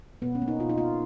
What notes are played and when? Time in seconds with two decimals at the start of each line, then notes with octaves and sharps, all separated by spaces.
0.22 B2 B3
0.35 C#4
0.42 A#3
0.48 D#4
0.59 B2 F4
0.69 D#4
0.78 A#3 F4